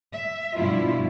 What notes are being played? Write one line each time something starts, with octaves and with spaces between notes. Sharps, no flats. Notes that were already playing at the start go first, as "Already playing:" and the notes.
E5
G2 B2 F3 E4 F4